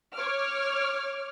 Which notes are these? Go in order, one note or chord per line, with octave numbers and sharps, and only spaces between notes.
C#5 D6 F6